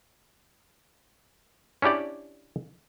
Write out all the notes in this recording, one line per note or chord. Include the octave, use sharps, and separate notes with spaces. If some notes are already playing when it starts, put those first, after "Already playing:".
C#4 D4 E4 G4 D5